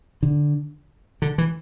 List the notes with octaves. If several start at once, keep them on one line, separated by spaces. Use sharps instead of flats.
D3
D3
E3